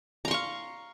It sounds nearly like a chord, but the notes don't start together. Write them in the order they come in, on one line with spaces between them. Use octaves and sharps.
A#5 C6 C#6 F5